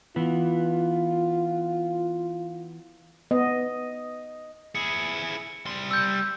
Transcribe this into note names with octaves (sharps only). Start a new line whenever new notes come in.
E3 B3 F4
B3 D#5
E4 G#4 C#7
G3 C6
E6 G6